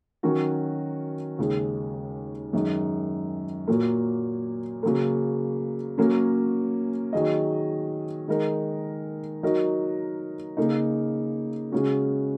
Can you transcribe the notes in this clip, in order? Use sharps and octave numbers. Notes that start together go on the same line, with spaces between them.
D#3 F#3 C#4 F#4 A#4
D#2 C#3 G#3
F#2 D#3 G#3 D#4
A#2 F#3 A#3
C#3 F#3 A#3
F#3 A#3 C#4
D#3 F#3 D#4 G#4 D#5
D#3 G#3 D#4 A#4
F#3 D#4 F#4 A#4 D#5
C#3 A#3 D#4
C#3 G#3 C#4 F#4